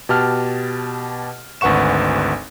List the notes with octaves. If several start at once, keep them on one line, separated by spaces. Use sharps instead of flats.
B2 G4 A5 F6
G#1 D2 B4 F#5 C#6 E7